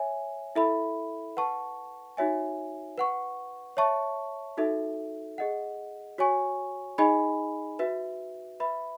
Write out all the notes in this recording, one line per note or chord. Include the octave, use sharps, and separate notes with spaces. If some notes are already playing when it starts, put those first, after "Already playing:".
Already playing: C#5 E5 G#5
E4 A4 E5 B5
B4 F#5 A5 C#6
D#4 F#4 C#5 E5 G#5
B4 F#5 C#6
C#5 E5 A5 C#6
D#4 F#4 A4 E5
G#4 D#5 F#5
F#4 C#5 G#5 C#6
D#4 G#4 D#5 G#5 B5
F#4 B4 E5
B4 E5 B5